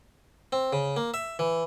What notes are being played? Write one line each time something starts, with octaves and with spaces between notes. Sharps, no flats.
C4
C#3
A#3
E5
E3